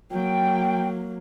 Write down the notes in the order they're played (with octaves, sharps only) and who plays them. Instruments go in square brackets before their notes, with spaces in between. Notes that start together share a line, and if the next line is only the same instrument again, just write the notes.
[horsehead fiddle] F#3 A#3 [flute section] G5